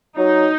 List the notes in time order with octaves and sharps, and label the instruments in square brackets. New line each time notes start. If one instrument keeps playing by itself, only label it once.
[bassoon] F#3 [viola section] D#4